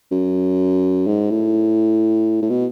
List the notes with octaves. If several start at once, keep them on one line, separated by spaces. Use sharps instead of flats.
F#2
G#2
A2
A2
B2